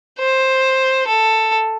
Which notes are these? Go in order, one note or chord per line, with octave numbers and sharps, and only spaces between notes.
C5
A4